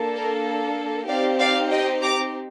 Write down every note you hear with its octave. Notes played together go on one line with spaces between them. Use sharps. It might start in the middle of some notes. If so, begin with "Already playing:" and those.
Already playing: A#3 D4 A4
A#4
C4 D#4 G4 D5 F5
D5 F5
D#5 G5
A#5 D6